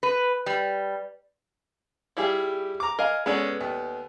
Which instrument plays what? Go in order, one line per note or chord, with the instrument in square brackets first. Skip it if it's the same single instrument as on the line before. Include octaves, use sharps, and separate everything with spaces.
[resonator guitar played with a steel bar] B4
G3
[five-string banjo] G3 F4 G#4 [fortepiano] E4 G4
[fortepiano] A#5 D6
[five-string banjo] A#4 D#5 F5 [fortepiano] G#5
[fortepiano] G#3 C#4 [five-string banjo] B3 A4 D5
[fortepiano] D#2